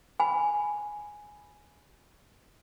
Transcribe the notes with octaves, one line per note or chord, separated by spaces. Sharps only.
G#5 B5